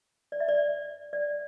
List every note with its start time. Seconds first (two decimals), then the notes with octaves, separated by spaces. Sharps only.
0.32 D5
0.40 E5
0.48 D5
1.13 D5